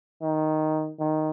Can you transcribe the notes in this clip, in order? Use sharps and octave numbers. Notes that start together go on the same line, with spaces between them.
D#3
D#3